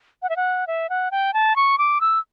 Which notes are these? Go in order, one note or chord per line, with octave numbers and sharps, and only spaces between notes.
F#5
E5
F#5
E5
F#5
G5
A5
C#6
D6
E6